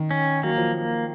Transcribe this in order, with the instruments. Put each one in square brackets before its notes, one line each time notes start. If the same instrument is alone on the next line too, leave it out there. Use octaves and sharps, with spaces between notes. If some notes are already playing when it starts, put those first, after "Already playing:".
Already playing: [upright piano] D#3
[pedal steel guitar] C#4
[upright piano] F#3 [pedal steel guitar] A#3
[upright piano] F3